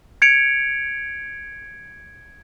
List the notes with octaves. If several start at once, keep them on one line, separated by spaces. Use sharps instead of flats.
G#6 C#7 D7 F7